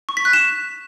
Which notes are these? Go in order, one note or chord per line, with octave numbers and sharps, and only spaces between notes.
C#6
B6
F#6
E7